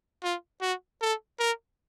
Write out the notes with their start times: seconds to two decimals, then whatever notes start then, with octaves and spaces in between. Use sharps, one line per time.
0.23 F4
0.61 F#4
1.02 A4
1.40 A#4